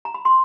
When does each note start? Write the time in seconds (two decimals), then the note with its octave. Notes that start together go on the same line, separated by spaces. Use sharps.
0.05 A#5
0.14 B5
0.25 C6